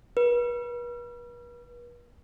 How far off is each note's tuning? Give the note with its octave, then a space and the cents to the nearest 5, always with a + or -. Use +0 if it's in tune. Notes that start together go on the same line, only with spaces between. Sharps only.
B4 -40